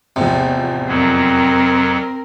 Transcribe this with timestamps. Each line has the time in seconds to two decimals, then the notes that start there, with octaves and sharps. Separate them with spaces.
0.16 A1 E2 C3 F3
0.88 F2 F#3 C4 A#4